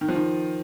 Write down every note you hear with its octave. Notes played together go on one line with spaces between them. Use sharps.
D#3
F3
D#3